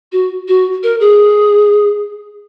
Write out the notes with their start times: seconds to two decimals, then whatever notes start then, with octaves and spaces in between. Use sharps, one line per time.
0.12 F#4
0.48 F#4
0.83 A#4
1.00 G#4